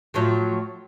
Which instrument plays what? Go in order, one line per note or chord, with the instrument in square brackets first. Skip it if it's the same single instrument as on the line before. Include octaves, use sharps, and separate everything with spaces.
[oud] A2 F3 F#3